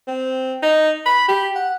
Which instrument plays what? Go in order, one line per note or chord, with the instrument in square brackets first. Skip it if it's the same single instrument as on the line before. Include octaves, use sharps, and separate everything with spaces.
[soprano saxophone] C4
D#4
B5
G4
F#5